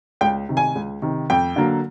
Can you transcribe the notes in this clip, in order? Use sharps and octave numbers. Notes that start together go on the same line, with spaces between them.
C#2 G5
C3 D#3
G#5
C#2
C3 D#3
F2 G5
D3 F#3 A#3